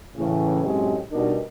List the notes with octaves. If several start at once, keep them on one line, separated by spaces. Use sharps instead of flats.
A2 C#3 E3
F#2 A2 F#3 G#3 C4 G4
B2 G3 D4 D#4 A#4